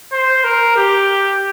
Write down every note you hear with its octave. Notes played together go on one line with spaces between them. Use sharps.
C5
A#4
G4